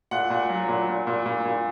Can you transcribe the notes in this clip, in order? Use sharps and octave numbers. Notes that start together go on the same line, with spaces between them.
A#2 F#5
A#2
F#3
A#2
A#2
A#2
A#2
A#2